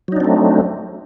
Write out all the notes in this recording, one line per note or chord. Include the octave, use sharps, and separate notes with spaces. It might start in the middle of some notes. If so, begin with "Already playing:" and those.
F#3 A3 C4 D4 D#4